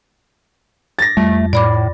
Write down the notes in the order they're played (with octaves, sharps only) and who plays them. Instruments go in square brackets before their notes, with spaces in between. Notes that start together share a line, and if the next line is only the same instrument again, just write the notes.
[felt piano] A6 A#6
[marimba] F2 [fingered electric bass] G3 [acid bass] A3
[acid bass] A2 [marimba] D5 B5 D6